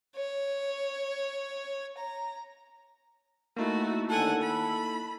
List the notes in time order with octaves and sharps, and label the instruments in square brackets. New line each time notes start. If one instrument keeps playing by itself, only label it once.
[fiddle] C#5
A#5
[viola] A3 F#4 [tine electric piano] A#3 D#4 E4
[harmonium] D#2 D3 A5 [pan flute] A4 [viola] F#5 G#5
[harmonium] A5 [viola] B5